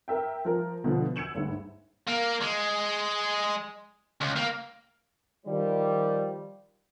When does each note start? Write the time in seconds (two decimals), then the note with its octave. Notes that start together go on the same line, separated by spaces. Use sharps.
0.08 A#4 E5 G5
0.45 F3 A#4
0.84 B2 D3 F3
1.16 E6 G#6 C#7 E7 F#7
1.35 G1 D2 G#2
2.08 A#3
2.42 G#3
4.21 C#2
4.36 A#3
5.46 D#3 F3 G3